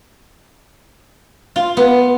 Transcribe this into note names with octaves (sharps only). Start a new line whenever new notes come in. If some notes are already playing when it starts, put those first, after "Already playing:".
F4
B3